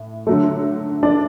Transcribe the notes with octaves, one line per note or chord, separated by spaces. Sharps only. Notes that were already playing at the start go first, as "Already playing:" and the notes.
Already playing: A2
D3 F#3 A3
D4 D5